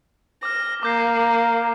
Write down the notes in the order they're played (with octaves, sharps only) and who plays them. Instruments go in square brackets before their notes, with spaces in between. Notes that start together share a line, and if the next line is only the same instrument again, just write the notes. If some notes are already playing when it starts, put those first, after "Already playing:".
[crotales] D6 F6 [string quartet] A#6
[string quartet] A#3 [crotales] D6 G6 C7